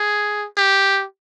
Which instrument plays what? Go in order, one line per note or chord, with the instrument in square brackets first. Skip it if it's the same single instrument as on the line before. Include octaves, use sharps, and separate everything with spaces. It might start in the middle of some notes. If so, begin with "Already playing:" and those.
Already playing: [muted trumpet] G#4
G4